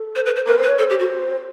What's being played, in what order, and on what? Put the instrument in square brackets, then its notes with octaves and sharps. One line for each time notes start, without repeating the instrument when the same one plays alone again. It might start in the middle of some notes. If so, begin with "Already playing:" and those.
Already playing: [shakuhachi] A4
[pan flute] C5
B4
C5
[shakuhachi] A#4 [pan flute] B4
[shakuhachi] C5
[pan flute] B4
[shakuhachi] C#5
[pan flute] A4 [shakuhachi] C5
[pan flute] G4
F#4